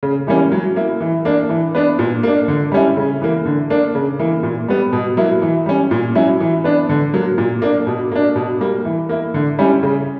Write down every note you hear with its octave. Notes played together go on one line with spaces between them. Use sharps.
C#3
E3 G3 A#3 C#4
F#3
A#3 E4
E3
A#3 D4
E3
B3 D4
A#2
A#3 D4
D3
G3 C#4 E4
C#3
E3 A#3
D3
A#3 D4
C#3
E3 A#3
A#2
G3 B3
B2
F#3 A#3 E4
E3
G3 C#4
A#2
F#3 C#4 E4
E3
B3 D4
D3
F#3 A#3
A#2
A#3 D4
B2
A#3 D4
B2
G3 A#3
E3
A#3 E4
D3
G3 C#4 E4
C#3